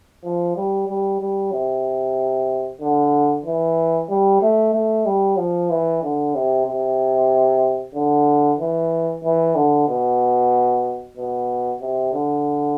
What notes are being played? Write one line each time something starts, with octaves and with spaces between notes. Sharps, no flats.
F3
G3
G3
G3
C3
D3
E3
G3
A3
A3
G3
F3
E3
D3
C3
C3
D3
E3
E3
D3
B2
B2
C3
D3